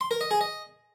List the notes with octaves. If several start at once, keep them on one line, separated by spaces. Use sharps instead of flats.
C6
A#4
D#5
G#4
D#5